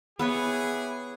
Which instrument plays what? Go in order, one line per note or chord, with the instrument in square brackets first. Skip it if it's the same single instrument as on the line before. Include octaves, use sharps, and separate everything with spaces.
[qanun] B3 B4 C#5 [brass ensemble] E4 G4 G#4